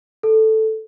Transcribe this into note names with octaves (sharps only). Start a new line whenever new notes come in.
A4